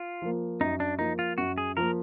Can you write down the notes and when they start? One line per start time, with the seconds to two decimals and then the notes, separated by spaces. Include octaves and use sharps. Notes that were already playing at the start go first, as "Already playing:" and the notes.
Already playing: F4
0.22 F3 A#3
0.60 F#2 D#4
0.80 D4
0.99 F3 A#3 D#4
1.19 F4
1.38 F#2 F#4
1.58 G#4
1.77 F3 A#3 A#4